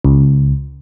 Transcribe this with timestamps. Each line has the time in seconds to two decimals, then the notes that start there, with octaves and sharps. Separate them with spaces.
0.05 C#2